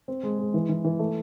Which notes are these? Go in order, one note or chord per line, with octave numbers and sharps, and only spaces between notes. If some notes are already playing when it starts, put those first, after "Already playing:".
C4
G#3
G#3
E3
E3
E3
A3